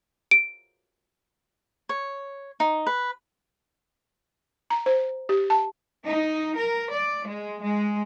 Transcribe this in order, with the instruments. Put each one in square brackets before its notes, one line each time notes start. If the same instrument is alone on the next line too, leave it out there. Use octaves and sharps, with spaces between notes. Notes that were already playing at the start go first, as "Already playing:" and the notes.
[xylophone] D7
[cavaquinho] C#5
D#4
B4
[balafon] A#5
C5
G4
A5
[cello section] D#4
A#4
D5
G#3
G#3